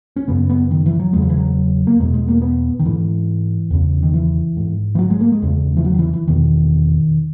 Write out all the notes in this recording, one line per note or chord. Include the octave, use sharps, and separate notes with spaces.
C#4
F#2 C#3 B3
B3
D#3
E3
F#3
E2 C#3 G#3
F#3
E3
F#3
A#3
E2 B2 G#3
G#3
A#3
B3
D#3
G#2 E3
E2 C#3
D#3
E3
G#2
E3
F#3
G#3
A#3
G#3
E2 C#3
E3
F#3
D#3
E3
E3
E2 B2 D#3